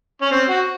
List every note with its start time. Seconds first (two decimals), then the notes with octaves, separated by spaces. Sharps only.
0.21 C#4
0.32 C4
0.49 F#4